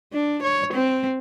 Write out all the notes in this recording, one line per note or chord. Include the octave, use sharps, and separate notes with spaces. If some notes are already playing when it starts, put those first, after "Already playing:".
D4
C#5
C4